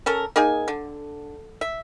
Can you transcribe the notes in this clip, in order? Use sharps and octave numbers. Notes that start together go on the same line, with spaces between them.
C#4 A4 A#4
A#3 D#4 G#4 G#5
D3
E5